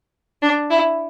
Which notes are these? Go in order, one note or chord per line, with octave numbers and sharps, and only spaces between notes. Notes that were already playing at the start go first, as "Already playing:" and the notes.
D4
E4